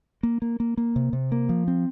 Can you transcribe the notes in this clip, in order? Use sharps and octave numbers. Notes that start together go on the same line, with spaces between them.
A#3
A#3
A#3
A#3
C3
C3
A#3
F3
C4